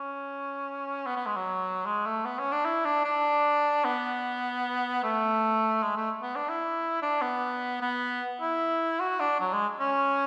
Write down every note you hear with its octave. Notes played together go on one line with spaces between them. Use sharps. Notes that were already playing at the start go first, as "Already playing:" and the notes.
Already playing: C#4
B3
B3
G#3
F#3
G#3
A3
B3
C#4
D4
E4
D4
D4
B3
A3
G#3
A3
B3
D4
E4
D4
B3
B3
E4
F#4
D4
F#3
G#3
C#4